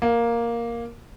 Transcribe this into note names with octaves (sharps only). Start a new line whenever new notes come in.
A#3